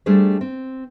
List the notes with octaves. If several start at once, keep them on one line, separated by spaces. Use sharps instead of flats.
G3 A3 D4 G#4 C5
C4